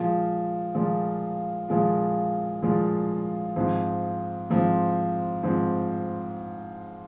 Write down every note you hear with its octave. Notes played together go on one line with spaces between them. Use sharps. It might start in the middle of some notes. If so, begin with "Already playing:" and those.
Already playing: A#2 F3 G#3 F4
A#2 F3 G#3 F4
A#2 F3 G#3 F4
A#2 F3 G#3 F4
G#2 F3 C4
G#2 F3 C4
G#2 F3 C4